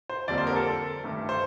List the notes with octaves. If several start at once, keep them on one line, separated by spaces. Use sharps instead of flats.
C5
F2 D3 G3 A#3 D5
C5
A#4
A4
G2 D#3 A3
C5